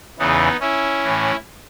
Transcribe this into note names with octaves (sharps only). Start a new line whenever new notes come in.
E2 C#3 E3 B3 D#4
C#4 E4
A2 E3